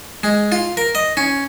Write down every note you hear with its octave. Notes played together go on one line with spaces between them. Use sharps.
G#3
F4
A#4
D#5
C#4